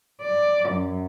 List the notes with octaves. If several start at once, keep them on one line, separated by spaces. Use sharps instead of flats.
D5
F#2